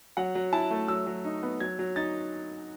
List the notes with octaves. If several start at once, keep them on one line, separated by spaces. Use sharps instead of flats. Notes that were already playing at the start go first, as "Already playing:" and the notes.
F#3 F#5
F#3
E4 A5
A3
F#3 E6
F#3
D#4
B3
F#3 G#6
F#3
D#4 A6